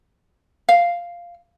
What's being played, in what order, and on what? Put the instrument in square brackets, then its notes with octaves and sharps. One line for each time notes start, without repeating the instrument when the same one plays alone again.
[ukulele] F5